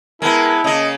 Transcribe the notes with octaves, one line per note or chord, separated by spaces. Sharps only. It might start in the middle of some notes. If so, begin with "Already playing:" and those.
G#3 B3 E4 A#4 A5
C#3 A#3 D#5